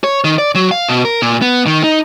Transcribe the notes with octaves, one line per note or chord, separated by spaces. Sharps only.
C#5
D#3
D5
F#3
F5
B2
A#4
A#2
B3
D#3
D#4